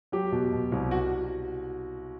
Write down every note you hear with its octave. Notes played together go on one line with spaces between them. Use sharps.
F#3 G4
B2
B2
C2
F#4